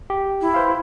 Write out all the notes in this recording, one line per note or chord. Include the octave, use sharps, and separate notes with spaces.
G4
E4
B4 C5 F5